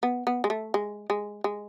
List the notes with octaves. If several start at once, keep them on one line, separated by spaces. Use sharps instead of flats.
B3
B3
G#3
A3
G#3
G#3
G#3